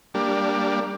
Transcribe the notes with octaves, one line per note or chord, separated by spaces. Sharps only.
G3 A#3 D4